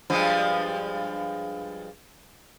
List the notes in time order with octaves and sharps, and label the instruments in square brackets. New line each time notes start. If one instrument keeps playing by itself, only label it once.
[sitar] G2 F3 G#3